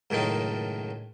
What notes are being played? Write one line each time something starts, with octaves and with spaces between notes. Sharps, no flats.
C#2 F#2 A2 D#3 D#4